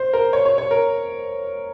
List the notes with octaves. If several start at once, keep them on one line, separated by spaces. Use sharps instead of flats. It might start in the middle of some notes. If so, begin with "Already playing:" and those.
Already playing: C5
A#4
C#5
C#5
C#5
A#4